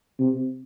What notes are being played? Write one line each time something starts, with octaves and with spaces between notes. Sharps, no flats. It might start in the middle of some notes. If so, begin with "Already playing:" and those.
C3